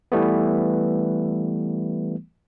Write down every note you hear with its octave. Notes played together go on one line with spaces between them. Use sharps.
E3 G3 A3 B3